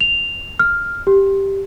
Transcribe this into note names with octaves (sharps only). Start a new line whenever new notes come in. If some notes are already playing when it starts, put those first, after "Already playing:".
F7
F6
G4